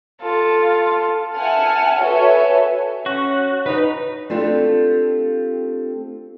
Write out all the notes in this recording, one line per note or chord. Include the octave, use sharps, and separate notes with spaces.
F4 A4
E5 F#5 G#5 A5 F6
F#4 A4 B4 C#5 E5 G#5
C#4 F#4
D#4 B4
A3 C4 D4 F4 G4 A4